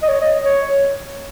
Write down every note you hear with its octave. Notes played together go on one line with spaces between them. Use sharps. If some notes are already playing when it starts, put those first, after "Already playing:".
D#5
C#5
D#5
C#5